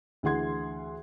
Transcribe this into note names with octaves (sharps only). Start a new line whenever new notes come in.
D2 E3 G#4 F#5 C6 G#6